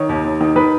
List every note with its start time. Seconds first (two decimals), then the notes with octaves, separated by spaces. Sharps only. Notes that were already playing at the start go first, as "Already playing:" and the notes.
Already playing: D#3 C#5
0.09 D#2
0.24 D#2
0.41 D#3
0.56 D#3 B4